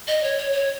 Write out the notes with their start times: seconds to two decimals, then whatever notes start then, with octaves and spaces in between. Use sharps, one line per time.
0.07 D#5
0.23 C#5
0.38 C#5
0.53 C#5